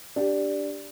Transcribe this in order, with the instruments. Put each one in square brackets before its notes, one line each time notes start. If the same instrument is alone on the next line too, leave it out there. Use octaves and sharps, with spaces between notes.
[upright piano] D4 G4